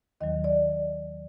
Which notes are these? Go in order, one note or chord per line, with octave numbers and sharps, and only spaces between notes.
D#2 D#3 F#3 D#5
D5